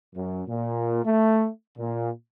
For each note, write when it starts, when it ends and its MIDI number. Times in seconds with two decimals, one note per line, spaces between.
0.15 0.41 42
0.48 1.04 46
1.04 1.48 57
1.78 2.10 46